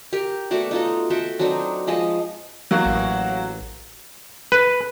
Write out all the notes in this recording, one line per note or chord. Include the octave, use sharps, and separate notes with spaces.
G4 A#4
A3 B3 F#4 D5
D#4 F4 F#4 A4
F#4 A4 E5 G5
F#3 C4 D4 D#4
F3 G#3 D#5 A5
F#3 A#3 F#4
A1
B4